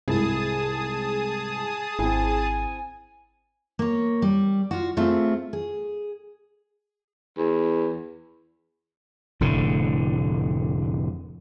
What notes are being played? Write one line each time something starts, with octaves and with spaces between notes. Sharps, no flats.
C2 G#2 C3 E4 G#4 A5 D#6
G#1 C4 E4 G#5
A#3 C#5
G3
F4 F#4
A3 C4 F4 G#4 E5
G#4
E2
F1 A2 D3